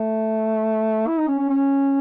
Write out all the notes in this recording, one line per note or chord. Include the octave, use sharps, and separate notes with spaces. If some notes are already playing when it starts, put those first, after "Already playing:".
Already playing: A3
E4
D#4
C#4
C#4
C#4